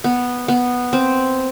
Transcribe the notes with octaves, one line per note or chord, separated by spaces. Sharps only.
B3
B3
C4